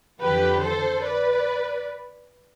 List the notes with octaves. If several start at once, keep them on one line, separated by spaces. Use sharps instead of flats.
F2 D3 F3 G4 B4
A4 C5
B4 D5